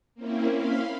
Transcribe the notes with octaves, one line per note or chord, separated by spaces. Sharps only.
A#3 C4 C#4 E4
F5 B5 C6